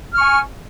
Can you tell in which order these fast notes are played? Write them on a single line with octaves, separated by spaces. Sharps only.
F6 C#6 G#5